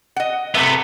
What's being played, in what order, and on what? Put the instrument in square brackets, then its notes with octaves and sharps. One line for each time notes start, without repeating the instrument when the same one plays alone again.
[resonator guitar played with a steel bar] D#5 F#5
[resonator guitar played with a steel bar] A2 C3 E5 [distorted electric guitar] A3 B3